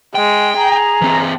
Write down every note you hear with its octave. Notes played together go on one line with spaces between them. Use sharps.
G#3 G5
G#4 A#5
E3 C4